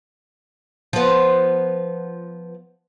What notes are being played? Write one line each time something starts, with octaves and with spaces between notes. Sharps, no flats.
F3 B3